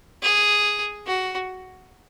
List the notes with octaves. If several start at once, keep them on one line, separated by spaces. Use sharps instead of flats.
G#4
F#4